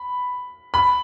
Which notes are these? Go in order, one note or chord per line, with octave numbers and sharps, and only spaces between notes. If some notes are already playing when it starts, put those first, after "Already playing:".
Already playing: B5
B5